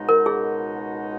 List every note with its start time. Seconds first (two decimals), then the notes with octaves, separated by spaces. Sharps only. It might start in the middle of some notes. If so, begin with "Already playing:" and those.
Already playing: C#2 B2 G#3 D#4 F#4
0.09 A#4
0.26 G#4